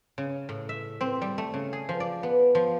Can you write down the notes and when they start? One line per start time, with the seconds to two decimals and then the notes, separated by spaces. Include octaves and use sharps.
0.18 C#3
0.49 A2
0.69 E5
1.01 C4
1.22 G3
1.38 A3
1.54 C#3
1.73 G#4
1.89 F3
2.00 D5
2.23 B3
2.55 F3